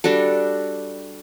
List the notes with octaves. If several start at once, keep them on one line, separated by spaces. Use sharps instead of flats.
G3 D4 F#4 A4